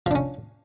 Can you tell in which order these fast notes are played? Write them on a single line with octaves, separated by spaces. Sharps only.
F3 D4 C#4